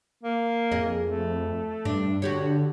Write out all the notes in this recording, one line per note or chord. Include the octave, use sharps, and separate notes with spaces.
A#3
F2 G#4 D#5
A3
G2 D4
D3 F#4 G4 C#5